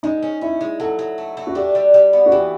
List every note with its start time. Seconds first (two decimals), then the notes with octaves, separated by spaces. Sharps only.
0.03 G#3 D#4
0.23 C#4
0.41 C#4 E4
0.61 G#3
0.80 F#3 A4
0.99 F#3
1.18 A3
1.37 A3
1.47 F#4
1.55 D4 G4
1.75 G3
1.94 G3
2.13 B3
2.26 F#4
2.32 E3 G4